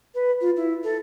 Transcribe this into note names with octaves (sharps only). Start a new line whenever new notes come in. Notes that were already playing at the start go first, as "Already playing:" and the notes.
B4
F4
E4
A4